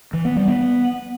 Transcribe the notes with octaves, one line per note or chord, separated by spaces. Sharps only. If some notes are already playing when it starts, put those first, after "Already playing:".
E3
B3
G3
B3